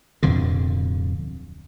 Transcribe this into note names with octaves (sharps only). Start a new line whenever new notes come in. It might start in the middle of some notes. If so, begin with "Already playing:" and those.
D1 F2 B2 D3